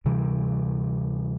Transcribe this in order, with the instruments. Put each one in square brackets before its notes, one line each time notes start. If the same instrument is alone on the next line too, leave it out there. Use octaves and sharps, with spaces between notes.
[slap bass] D2 C3 E3 G3